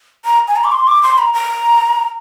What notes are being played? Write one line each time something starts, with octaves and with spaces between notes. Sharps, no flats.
A#5
G#5
A#5
D6
C6
D6
C6
A#5
A#5